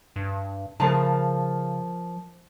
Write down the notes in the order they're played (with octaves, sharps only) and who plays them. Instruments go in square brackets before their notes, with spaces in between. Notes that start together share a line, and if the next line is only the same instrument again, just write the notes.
[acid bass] G2
[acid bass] C#3 [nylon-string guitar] F3 A#4 A5